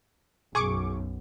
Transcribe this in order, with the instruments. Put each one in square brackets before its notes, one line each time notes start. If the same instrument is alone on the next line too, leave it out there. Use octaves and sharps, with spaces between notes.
[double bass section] B1 F#2 [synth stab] G#4 C#6 D6